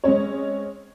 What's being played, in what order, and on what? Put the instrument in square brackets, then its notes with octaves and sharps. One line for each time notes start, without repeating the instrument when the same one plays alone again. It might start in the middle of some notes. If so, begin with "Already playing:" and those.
[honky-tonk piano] G#3 C4 C#4 C#5